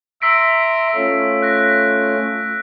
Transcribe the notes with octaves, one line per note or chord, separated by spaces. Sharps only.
E5 A#5 C6 E6 B6 D7
A3 C#4 F4
F#6 A#6 B6